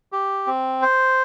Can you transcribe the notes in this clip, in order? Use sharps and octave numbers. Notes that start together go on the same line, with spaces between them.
G4
C4
C5